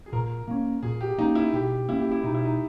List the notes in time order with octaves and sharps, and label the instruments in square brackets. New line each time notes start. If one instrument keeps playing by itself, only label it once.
[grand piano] G#4
[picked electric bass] A#2 [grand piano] A#4
[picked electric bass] A#3 C#4
[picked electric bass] A#2 [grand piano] G#4
[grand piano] G4
[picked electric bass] A#3 C#4 [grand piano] D#4
[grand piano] E4
[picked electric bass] B2 [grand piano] G4
[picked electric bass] A#3 C#4 [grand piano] E4
[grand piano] G4
E4
[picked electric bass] B2 [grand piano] D#4
[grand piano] E4
D#4